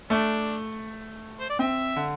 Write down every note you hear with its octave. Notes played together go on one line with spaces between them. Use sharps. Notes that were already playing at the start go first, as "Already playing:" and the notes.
A3 D4
C5
D5
C4 E5
D3